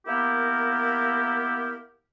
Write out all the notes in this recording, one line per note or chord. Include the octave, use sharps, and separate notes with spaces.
A#3 B3 E4 G4 A#4